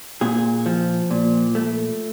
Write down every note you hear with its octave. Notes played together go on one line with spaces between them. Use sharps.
A#2 G#4
F3
A#2
A3